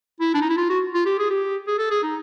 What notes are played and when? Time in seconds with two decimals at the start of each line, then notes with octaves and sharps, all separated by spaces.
0.21 E4
0.34 D4
0.41 D#4
0.50 E4
0.57 F4
0.70 F#4
0.94 F4
1.06 G4
1.19 G#4
1.30 G4
1.67 G#4
1.79 A4
1.91 G#4
2.03 D#4